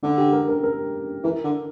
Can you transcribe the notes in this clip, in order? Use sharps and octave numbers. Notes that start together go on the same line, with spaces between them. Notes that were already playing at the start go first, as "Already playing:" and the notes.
D3 D4
G4
A#4
A#4
A#4
E3 A#4
D3